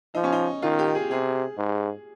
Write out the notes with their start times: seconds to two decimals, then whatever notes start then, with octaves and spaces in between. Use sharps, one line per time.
0.15 F3 D#4
0.24 C#4
0.32 D#4
0.62 D#3 F4
0.79 G4
0.95 G#4
1.11 C3 G#4
1.58 G#2